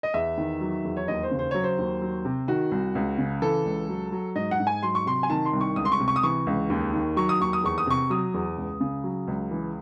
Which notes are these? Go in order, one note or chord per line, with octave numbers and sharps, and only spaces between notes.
D#5
E2 E5
D#3
F#3
E2
C#5
D#2 D#5
C5
C#3
C5
F#3 C#5
C5
D#2
F#3
C3
D#3 F#4
C2
C#2
C#3
E3 A4
C#2
F#3
F#3
G#2 D#5
F#5
G#2
G#5
F#3 C6
C#6
C3 C6
G#5
D#3 A5
C6
C2
C#6
C#2 D#6
C6
C#6
C3
C#6
D#6
E3 C#6
C#2
D#2
D#3
F#3 C#6
D#6
D#2 C#6
D#6
E2 C#6
D#6
C3 C#6
F#3 D#6
E2
C#2
C#3
F#3
C#2
E3